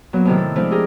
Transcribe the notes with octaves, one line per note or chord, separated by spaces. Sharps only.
A#2 F#3 B3
A2 C3 D#3
A4
F3 G#3 A3 C4 D4 E4
G4 G#4 A#4